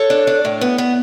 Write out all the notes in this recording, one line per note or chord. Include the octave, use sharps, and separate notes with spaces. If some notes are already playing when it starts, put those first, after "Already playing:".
Already playing: A4 C#5
D4
D4
A2
B3
B3